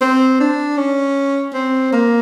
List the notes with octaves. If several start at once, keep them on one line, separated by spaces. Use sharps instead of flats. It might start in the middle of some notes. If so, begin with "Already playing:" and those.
C4
D4
C#4
C4
A#3